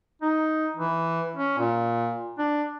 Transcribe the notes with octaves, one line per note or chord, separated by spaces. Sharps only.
D#4
E3
C#4
A#2
D4